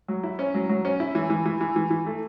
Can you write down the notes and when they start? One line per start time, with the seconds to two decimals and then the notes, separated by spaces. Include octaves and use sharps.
0.08 F#3
0.23 E4
0.39 C#4
0.54 F#3
0.69 F#3
0.85 C#4
1.00 E4
1.15 E3
1.30 E3
1.46 E3
1.61 E3
1.76 E3
1.91 E3
2.07 A3